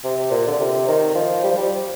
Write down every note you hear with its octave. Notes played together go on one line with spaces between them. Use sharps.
C3
A#2
D3
C3
D#3
F3
G3
F3
G3